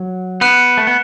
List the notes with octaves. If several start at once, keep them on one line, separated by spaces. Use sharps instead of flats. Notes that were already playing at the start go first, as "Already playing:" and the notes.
Already playing: F#3
B3 F#6 C#7 E7
A3
B3